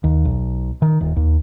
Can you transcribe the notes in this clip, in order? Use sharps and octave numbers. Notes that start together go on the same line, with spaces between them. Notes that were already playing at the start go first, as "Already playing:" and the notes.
D#2
B1
D#3
D#1
D#2